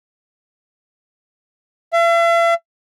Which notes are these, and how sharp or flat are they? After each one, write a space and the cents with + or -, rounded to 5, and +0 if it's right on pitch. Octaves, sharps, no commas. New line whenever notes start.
E5 +45